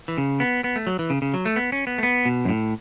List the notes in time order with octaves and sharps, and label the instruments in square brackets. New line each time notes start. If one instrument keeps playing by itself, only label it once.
[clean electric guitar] E3
C#3
B3
B3
A3
F#3
E3
C#3
C#3
F#3
A3
B3
C#4
B3
A3
B3
B2
F#2
A2